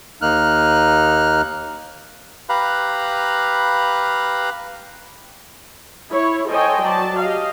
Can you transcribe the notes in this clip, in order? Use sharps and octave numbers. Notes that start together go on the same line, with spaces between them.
D#2 A#3 D#4 F6 F#6
G4 B4 F5 A#5 B5 F#6
E4 C#5
A4 C5 C#5 D#5 G5 G#5
F#3 D5 A5
G4 D#5 F5